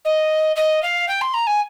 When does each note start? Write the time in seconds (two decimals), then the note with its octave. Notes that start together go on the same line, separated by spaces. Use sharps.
0.05 D#5
0.56 D#5
0.83 F5
1.08 G5
1.21 C6
1.34 A#5
1.47 G#5